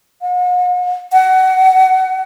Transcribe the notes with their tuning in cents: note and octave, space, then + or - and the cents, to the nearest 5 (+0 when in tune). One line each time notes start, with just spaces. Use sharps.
F#5 -45
F#5 +20